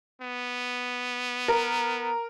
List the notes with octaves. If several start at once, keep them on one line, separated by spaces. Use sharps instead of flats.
B3
A#4